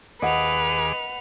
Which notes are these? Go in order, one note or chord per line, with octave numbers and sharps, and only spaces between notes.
D#2 G#4 B4 D#5 F#5 D6 C#7 F7